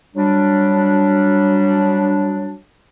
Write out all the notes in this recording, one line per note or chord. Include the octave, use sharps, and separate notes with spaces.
F#3 G3 D4